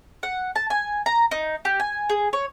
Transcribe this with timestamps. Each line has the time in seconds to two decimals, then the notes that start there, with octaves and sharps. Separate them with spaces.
0.23 F#5
0.56 A5
0.70 G#5
1.06 A#5
1.31 D#4
1.65 G4
1.80 G#5
2.10 G#4
2.33 C#5